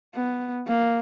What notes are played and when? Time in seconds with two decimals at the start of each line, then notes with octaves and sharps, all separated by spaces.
0.15 B3
0.68 A#3